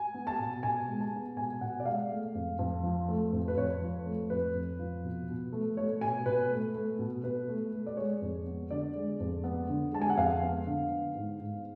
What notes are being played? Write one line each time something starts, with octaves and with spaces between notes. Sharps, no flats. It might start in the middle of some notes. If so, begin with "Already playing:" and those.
Already playing: G#5
B3
A5
B2
B2 G#5
G#3
A5
B3
B2 G#5
B2 F#5
D5
G#3 F5
A3
F2
F2
F3
A3
F2
B4
F2 C#5
F3
A3
F2 B4
F2
F3
B2
B2
A3
A3 C#5
B2 G#5
B2 B4
A3
A3
B2
B2 B4
A3
A3
D5
G#3 C#5
F2
B3
D3 D5
G#3
F2
B3
D3
G#3 A5
G#5
F#5
F2 F5
B3
D3
B3
G#2
G#2